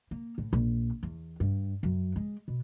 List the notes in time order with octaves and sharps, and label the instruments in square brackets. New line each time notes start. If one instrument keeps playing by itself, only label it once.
[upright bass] A#3
A2
A#1
E2
G2
F#2
G#3
B2